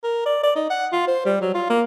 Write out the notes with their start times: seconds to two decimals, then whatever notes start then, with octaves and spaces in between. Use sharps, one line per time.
0.03 A#4
0.26 D5
0.43 D5
0.55 D#4
0.70 F#5
0.92 F4
1.08 C5
1.26 G3
1.41 F#3
1.54 F4
1.70 A#3